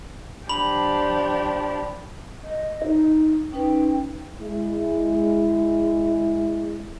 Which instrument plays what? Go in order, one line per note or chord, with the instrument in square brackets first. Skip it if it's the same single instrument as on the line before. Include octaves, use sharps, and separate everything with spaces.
[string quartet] F3 D4 G4 [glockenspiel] B5 F#7
[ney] D#5
D#4
[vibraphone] C#4 D#4 B4 [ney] G5
[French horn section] G#3 E4